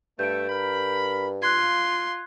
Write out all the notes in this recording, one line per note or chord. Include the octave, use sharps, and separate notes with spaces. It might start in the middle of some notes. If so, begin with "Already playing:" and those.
G2 A3 G6 D7
A#4 B5
F4 C6 F#6 G#6